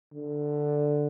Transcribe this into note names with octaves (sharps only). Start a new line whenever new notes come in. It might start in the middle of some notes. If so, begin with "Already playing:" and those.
D3